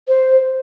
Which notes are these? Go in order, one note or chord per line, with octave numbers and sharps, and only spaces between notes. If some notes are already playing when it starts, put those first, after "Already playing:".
C5